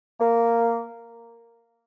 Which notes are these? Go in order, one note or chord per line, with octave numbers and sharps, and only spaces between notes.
A#3